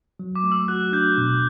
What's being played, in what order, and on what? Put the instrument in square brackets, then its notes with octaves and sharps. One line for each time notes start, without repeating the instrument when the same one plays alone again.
[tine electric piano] F#3
[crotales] D6
[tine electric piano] A3
[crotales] E6
[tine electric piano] F#4 [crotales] F#6
[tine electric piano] D4 [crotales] G6
[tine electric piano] B2